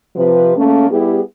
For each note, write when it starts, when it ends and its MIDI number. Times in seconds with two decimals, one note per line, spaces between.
0.16 0.52 48
0.16 0.52 53
0.16 0.52 71
0.57 0.90 49
0.57 0.90 57
0.57 0.90 58
0.57 0.90 61
0.90 1.20 55
0.90 1.20 59
0.90 1.20 64
0.90 1.20 67
0.90 1.20 68